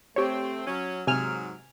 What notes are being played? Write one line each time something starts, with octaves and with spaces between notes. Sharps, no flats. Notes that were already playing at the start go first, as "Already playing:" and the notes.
A3 C4 G4 C#5
F#3 C#4
G#2 C3 F#3 G#5 F6